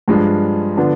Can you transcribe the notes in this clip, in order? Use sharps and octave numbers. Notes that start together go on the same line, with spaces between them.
G2 F3 G#3 D4
D3 F3 B3 D4